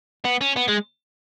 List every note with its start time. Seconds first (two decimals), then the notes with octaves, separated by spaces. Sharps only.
0.25 B3
0.41 C#4
0.56 B3
0.68 G#3